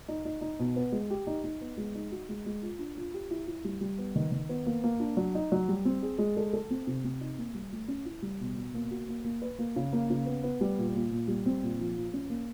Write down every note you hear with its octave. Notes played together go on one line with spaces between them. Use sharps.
D#4
D#4
D#4
B2
B3
G#3
G4
D#4
D#4
B3
G#3
D#4
F#4
G#3
G#3
F4
D4
F4
G4
E4
E4
G3
G3
B3
D#3
D#3
B3
A#3
A#3
D4
F#3
D#4
F#3
G3
C4
G#4
G#3
A4
A4
C4
C3
C4
D#4
A#3
G3
A3
C#4
E4
G3
B2
B2
A#3
F#4
A#3
A#3
B4
A#3
C#3
A#3
C#3
B3
B3
G3
A#2
A#2
A#2
G3
C4
A#2
F3
F3
C#4
A#3